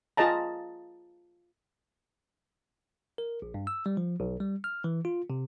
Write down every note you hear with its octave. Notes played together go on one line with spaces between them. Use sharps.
F4 G#4 D#5 A5 A#5
A#4
A#1
G2
E6
G3
F3
B1
G3
F6
E3
F4
C3